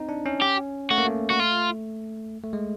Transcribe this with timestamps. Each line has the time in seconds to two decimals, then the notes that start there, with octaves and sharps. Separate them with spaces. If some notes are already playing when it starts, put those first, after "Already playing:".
Already playing: C4 D#4
0.09 D4
0.26 C#4
0.42 G4
0.91 A3 F#4
0.98 A#3
1.05 A3
1.30 F#4
1.40 F4
2.44 A3
2.53 G#3